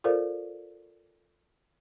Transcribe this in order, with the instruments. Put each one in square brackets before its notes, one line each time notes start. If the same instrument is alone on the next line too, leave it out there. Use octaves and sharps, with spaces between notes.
[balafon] F4 A4 A#4 C5 D5 F5